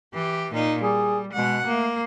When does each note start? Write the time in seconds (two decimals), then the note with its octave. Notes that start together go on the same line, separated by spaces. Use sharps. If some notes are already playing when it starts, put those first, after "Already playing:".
0.14 E3 G4
0.52 A#2 D#4
0.82 G3 G#4
1.33 B2 G#3 F#5
1.67 A3 A#3